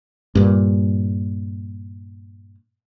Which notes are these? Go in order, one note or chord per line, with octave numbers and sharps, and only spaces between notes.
G2 A#2